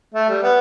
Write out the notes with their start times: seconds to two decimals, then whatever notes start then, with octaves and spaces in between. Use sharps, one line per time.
0.15 A3
0.29 G3
0.43 B3